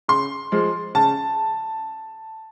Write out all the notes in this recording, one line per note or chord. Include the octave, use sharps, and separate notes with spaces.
C#3 C6
F3 G#3
C#3 A5